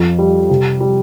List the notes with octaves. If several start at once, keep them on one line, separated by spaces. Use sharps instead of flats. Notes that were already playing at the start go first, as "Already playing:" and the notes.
Already playing: F2 F3
G3
C3
G3